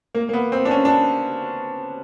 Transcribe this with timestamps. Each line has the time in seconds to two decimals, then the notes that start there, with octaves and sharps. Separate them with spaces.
0.15 A#3
0.29 A#3
0.33 B3
0.52 C4
0.65 D4
0.71 C#4
0.85 D4